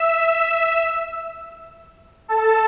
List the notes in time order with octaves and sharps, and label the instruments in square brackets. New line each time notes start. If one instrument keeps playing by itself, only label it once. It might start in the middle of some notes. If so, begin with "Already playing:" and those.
Already playing: [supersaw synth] E5 E6
E5 E6
A4 A5